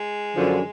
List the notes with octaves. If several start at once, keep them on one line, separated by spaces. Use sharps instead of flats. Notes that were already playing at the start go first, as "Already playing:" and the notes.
Already playing: G#3
F#2 D3 F3